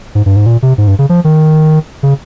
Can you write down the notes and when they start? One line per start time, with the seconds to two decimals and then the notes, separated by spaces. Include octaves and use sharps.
0.15 G#2
0.26 G2
0.36 G#2
0.46 A#2
0.63 C3
0.78 G#2
0.88 G2
0.99 C#3
1.09 F3
1.24 D#3
2.03 C#3